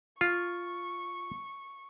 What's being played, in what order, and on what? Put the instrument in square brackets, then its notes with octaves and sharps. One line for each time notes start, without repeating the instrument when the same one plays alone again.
[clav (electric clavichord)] F4 [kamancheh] C#6